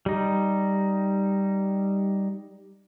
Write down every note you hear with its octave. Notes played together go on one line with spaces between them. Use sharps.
G3 D#4